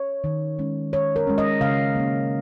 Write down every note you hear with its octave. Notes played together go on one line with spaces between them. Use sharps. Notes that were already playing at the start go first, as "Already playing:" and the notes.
Already playing: C#5
D#3
G#3 C#4
D#3 C#5
A#4
G#3 C#4
D#5
C#3 F5
A#3 C#4